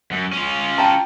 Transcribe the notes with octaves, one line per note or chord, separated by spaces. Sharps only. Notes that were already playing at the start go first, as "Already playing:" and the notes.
F#2
C#4 F4
G5 A5 A#5